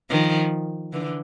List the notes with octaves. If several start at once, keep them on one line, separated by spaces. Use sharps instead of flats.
D#3 F3
D3 E3